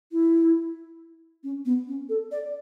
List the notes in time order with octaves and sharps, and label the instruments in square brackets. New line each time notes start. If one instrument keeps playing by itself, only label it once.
[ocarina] E4
C#4
B3
C#4
A4
D5